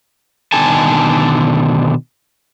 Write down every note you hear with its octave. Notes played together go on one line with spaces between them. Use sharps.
B2 D3 D#3 A4 G#5 A5